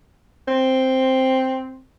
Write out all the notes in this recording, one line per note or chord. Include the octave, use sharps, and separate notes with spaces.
C4